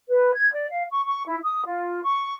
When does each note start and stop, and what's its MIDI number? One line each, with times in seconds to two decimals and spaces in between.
0.08 0.31 71
0.33 0.51 92
0.52 0.69 74
0.69 0.83 77
0.90 1.05 85
1.05 1.23 85
1.26 1.36 64
1.43 1.62 87
1.66 2.02 65
2.03 2.34 85